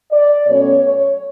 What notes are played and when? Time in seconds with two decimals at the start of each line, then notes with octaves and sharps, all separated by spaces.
0.11 D5
0.48 B2 F#3 A3 C#4 C#5
0.84 C#5